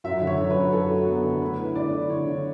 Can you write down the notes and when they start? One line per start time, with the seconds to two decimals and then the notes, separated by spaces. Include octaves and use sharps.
0.04 F#2 E5
0.21 D3
0.27 C#5
0.39 F#2
0.50 B4
0.56 F#2
0.73 F#2 A4
0.90 F#3
1.08 B3
1.24 D3
1.42 A3 B4
1.58 E4
1.75 D3 D5
1.93 E4
2.10 D3 C#5
2.27 D3